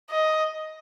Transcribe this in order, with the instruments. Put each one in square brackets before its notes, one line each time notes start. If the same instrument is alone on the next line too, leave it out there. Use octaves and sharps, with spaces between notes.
[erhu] D#5